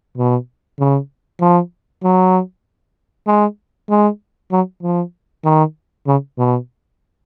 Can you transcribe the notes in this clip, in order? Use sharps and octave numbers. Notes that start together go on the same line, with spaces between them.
B2
C#3
F3
F#3
G#3
G#3
F#3
F3
D#3
C#3
B2